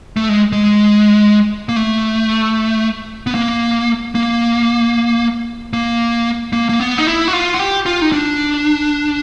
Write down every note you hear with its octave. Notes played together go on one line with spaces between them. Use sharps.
A3
G#3
G#3
A#3
A3
B3
A#3
A#3
A#3
A#3
A#3
B3
D#4
E4
F#4
F4
F#4
G4
F4
D#4
D4